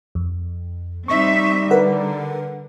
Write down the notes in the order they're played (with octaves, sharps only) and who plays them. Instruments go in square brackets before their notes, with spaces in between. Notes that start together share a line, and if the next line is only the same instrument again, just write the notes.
[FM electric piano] F2
[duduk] G3 [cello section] C4 D#4 E5 [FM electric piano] C#6
[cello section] D3 [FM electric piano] A#4 B4 F#5